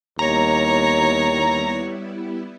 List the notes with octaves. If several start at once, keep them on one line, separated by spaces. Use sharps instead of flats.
D#2 G3 B3 E4 C#5 A#5